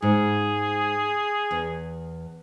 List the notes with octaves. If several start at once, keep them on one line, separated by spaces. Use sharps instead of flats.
G#2 G#4
E2